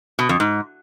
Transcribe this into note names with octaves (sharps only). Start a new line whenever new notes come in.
B2
F2
G#2